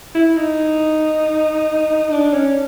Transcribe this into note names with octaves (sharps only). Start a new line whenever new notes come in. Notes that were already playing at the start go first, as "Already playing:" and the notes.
E4
D#4
D4
C#4